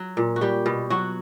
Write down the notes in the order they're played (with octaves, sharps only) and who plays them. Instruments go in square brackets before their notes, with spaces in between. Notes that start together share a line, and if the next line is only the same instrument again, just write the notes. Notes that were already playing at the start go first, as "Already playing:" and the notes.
Already playing: [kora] F#3
A#2
F#4
G3 G4
B2
F#3 F#4